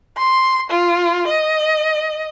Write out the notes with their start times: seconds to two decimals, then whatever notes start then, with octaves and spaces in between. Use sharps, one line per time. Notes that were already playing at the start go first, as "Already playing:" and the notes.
0.18 C6
0.70 F4
1.28 D#5